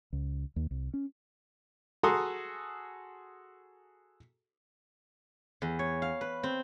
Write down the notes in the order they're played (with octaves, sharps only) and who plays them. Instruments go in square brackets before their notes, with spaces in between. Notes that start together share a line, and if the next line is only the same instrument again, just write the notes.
[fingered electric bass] C#2
D#2
C2
C#4
[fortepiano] F#4 G#4 A4 A#5 C6 D#6
[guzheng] E2
C#5
F5
B4
C4